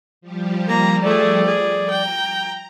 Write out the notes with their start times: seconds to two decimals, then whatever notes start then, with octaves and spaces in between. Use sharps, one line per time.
0.21 F3 G3 G4
0.67 A#3 A#5
1.03 A3 G#4 D5
1.46 G#4
1.90 G5 A#5